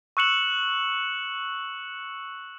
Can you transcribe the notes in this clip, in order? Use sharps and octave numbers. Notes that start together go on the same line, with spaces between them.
C#6 E6 F#6 C#7 E7 F#7